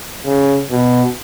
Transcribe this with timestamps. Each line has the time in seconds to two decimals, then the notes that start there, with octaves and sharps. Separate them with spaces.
0.26 C#3
0.71 B2